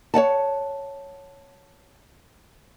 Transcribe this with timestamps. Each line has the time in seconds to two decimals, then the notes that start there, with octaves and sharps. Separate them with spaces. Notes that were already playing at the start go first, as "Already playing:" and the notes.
0.14 C#5 D5 F#5 A5